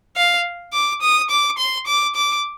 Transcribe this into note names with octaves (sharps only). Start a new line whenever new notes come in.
F5
D6
D#6
D6
C6
D6
D6